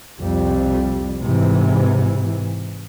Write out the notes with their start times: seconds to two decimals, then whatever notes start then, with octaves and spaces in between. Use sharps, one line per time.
0.19 C2 F2 G3
1.21 G#2 C3 E3